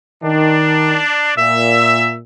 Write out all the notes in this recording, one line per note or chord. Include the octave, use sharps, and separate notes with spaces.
D#3 D4
A#2 E5